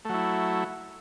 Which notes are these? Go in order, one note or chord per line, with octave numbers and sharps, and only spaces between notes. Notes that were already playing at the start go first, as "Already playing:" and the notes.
F#3 A3 E4